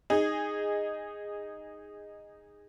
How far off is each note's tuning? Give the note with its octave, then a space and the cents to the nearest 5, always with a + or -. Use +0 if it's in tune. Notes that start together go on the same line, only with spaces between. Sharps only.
D#4 +0 G#4 -15